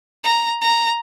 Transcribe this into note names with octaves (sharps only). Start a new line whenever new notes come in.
A#5
A#5